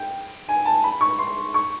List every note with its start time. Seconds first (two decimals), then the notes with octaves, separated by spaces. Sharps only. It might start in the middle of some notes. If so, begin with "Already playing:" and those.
Already playing: G5
0.49 G#5
0.65 A5
0.84 B5
1.01 C#6
1.19 C6
1.54 C#6